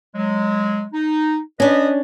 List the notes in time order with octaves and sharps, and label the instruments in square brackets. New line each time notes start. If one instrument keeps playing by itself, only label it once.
[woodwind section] F#3 G#3
D#4
[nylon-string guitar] C#4 D4 [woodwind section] B4 D#5